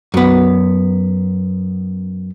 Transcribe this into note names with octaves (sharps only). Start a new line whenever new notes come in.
F#2 B3